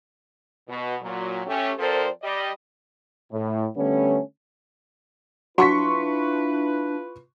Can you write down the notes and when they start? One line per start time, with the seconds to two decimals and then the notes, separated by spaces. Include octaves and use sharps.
0.69 B2
1.02 A#2 F#3
1.47 A3 C#4 G4
1.79 F3 C4 A4 A#4 C5 D5
2.22 G3 D5 D#5
3.33 A2
3.77 D3 G3 A3 B3 C#4
5.58 F#3 D4 E4 F4 B4 C6 C#6 B6